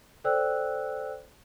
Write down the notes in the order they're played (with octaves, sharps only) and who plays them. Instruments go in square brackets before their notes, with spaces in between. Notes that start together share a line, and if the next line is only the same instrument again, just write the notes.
[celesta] A4 C5 D5 G5 E6 F#6